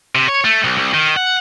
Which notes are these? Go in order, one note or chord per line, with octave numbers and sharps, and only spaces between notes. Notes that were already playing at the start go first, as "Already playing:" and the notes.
C3
C#5
A3
B1
C2
D#3
F#5